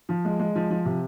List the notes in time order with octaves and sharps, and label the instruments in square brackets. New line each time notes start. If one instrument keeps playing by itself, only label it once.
[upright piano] F3
G#3
G#3
F3
F3
C3